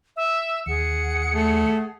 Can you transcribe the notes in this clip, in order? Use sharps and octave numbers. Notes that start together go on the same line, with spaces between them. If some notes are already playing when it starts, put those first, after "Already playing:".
E5
D#2 G#4 F#5 C#7
A3